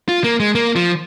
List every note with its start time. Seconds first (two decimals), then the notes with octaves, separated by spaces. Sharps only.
0.08 F4
0.24 A#3
0.40 G#3
0.55 A#3
0.76 F3